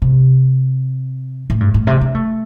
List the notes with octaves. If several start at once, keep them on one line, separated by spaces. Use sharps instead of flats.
C3
A2
G2
A2
C3
D4
A3